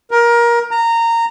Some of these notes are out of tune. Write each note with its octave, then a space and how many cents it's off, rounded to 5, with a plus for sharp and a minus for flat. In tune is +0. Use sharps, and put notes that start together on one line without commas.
A#4 +20
A#5 -15